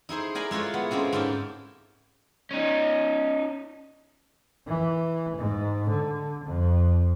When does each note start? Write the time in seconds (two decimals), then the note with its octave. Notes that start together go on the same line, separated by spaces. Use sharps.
0.09 D#4 E4 G#4 C5
0.35 A#4 D5 G#5 A#5 B5
0.51 G#3 E4 F4 B4 C#5
0.74 B3
0.91 G#3 A#3 C4 C#4
1.12 G#2 C#4 E4 G4 A5
2.51 C#4 D#4
4.67 E3
5.37 G#2
5.89 D3
6.44 F2